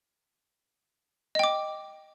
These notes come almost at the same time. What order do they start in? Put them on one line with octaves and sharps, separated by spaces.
D#5 G5 D6